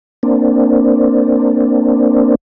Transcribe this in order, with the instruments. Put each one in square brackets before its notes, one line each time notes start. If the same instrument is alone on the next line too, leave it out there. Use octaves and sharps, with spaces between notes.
[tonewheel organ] A#3 C4 D4